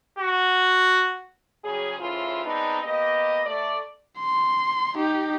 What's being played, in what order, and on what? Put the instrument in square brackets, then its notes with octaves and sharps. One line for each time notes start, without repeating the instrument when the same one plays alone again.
[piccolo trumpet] F#4
[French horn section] C#3 F#3 G3 G#4
A2 C#3 E3 E4 F4 C5
G#3 B3 C4 D4 D#4
A#3 B3 G4 D#5
A3 D5
[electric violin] C6
D#4 G4